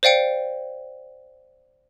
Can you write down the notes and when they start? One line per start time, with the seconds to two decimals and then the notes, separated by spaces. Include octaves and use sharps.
0.03 C5 D5 F5 G5 C#7